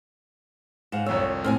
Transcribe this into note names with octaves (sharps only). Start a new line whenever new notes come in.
G#2 F5 F#5 E7
C2 F2 C#5 E6
A2 D#3 C4 G#5 F6